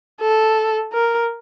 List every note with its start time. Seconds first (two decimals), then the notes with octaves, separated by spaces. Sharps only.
0.21 A4
0.93 A#4